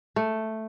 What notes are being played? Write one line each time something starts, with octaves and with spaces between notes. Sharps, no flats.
A3